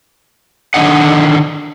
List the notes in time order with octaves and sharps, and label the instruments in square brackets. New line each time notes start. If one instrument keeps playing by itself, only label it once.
[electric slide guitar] D3 D#3 D4 D#5 F#5